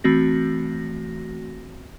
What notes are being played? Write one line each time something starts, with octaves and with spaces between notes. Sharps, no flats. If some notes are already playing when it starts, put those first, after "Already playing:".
E3 A3 C4 F#4 A#6